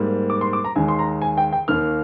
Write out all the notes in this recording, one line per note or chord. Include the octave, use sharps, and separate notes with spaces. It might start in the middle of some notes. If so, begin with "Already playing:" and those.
Already playing: G#2 G3 A#3
D6
C6
D6
A#5
D#2 D#3 G#3 G#5
C6
A#5
G#5
G5
G5
D#2 D#3 A#3 F6